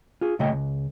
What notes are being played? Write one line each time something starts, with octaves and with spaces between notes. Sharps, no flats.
F4 G#4
A#2 C#3 A3 C#5 D#5 G5
C#2